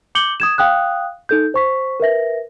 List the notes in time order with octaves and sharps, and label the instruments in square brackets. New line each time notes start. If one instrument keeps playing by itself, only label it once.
[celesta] D6 G6 C#7 F#7 G7
D#6 G#6 E7
F5 G5 D#6 F#6
D#4 A4 G6
C5 C#6 B6
A#4 B4 E5 A#6